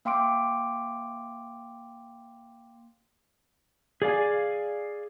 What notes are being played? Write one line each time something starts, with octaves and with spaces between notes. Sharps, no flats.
A#3 F5 G5 C6 D6 D7
G#4 D5 F5 G#5